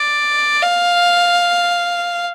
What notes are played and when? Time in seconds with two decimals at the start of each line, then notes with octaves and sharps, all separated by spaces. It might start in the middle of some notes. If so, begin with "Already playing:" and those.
Already playing: D5
0.63 F5